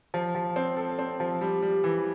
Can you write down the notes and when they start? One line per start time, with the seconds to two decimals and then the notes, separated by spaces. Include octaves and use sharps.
0.14 F3
0.35 F3
0.56 C4
0.77 A4
0.99 C4
1.20 F3
1.41 G3
1.62 G3
1.84 E3